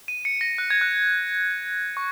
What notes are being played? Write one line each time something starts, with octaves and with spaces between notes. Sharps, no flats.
D#7
C#7
A#6
F#6
G#6
F#6
C#6